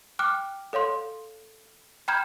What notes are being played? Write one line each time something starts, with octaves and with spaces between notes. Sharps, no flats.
G5 D6 F6 F#6
A4 C#5 F5 C6
G5 A#5 B5 F6 G6 G#6